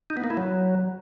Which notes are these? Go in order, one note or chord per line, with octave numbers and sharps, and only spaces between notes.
D#4
B3
A#3
E4
F#3